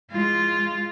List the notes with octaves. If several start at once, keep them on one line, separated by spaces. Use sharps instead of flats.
G#3 F4